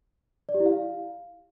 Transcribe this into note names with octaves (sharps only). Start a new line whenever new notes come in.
D5
G4
E4
F5